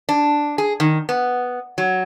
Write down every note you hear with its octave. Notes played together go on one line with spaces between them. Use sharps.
D4
G#4
D#3
B3
F#3